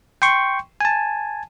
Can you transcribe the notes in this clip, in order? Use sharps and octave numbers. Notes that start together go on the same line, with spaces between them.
G5 C6 C#6
G#5 A5